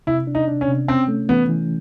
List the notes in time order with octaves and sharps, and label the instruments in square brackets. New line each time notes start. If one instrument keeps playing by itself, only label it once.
[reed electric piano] C3 [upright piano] E4
[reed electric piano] D4
[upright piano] D#4
[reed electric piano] D4
[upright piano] C#4
[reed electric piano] C3
[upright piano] C4 [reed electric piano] C#4
[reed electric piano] A3
[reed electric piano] E3 [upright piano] B3
[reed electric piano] E3